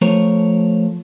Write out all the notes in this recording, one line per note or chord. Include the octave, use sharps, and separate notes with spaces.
F3 A3 A#4 C5 C#5